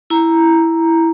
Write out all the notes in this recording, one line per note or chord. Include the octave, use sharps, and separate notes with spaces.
E4 A#5